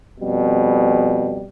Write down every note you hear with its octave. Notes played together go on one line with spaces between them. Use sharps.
F2 B2 G3